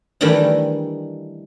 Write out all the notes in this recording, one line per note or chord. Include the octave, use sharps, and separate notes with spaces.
D#3 E3 G3 A3 D4 D#4